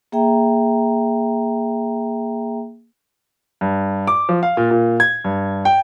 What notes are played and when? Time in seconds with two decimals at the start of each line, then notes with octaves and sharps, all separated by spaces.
0.12 A#3 G#4 E5 G5 A#5
3.61 G2
4.07 D6
4.29 F3
4.43 F5
4.57 A#2
4.71 A#2
5.00 G#6
5.24 G2
5.65 G5